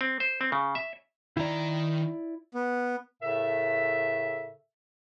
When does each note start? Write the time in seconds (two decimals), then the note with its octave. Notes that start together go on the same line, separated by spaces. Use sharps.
0.01 C4
0.20 C5
0.41 C4
0.52 C#3
0.75 E5
1.37 D#3 E4 D5 A#5
2.55 B3
3.22 A2 C#3 A4 A#4 E5